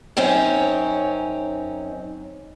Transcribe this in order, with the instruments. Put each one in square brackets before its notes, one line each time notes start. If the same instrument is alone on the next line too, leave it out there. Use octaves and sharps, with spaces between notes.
[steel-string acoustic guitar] F#2 C4 C#4 D#4